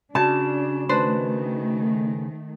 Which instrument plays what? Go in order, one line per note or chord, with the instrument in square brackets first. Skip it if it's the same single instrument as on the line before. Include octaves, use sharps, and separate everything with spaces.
[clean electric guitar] C#3 [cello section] D4 [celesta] F#4 E7 [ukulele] A5
[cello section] D#3 A3 [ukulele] D4 B4 C5